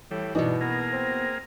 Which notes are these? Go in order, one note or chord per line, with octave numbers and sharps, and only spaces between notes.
A2 E3 G3
G2 B2 E3 D4 D#4 F#4
A#3 B3 G#4 A#4
C4